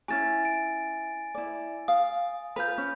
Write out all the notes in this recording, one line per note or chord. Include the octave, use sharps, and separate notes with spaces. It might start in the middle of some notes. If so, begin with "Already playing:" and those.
C#4 E4 F#4 G#5 A6
D7
E4 D5
F5 D#6
F4 B4 B5 G6
C#4